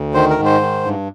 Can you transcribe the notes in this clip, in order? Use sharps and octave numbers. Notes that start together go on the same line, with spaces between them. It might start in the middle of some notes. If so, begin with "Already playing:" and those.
Already playing: D2
D#3 C5
A#4
G#2
C5
D#3
G2